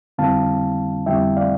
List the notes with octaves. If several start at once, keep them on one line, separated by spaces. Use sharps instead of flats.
F2 D3 G3 C4 E4 F5 A5
F2 D3 G3 C4 E4 E5 G5
D5 F5